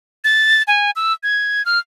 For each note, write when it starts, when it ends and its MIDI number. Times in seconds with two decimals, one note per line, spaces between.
0.24 0.63 93
0.67 0.91 80
0.96 1.13 88
1.23 1.65 92
1.65 1.79 89